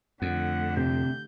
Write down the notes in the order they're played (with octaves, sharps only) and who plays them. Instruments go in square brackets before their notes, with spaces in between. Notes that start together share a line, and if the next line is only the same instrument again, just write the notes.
[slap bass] F2 [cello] D3 A3 [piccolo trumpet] F#5
[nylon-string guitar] C3 [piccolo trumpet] G6